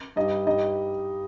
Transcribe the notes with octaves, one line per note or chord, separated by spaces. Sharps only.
G2 G3 D#4 D#5
G2 G3 D#4 D#5